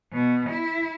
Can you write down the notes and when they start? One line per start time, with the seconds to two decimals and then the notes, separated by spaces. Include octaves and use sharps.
0.12 B2
0.49 E4